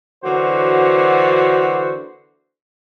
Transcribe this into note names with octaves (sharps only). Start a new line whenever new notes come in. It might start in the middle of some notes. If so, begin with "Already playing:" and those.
D3 E3 F#3 A#3 F#4 C5